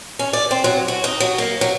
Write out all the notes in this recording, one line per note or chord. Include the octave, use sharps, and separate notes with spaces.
C#4
D5
C4
F#3
F#4
D#4
F#3
A#3
F#3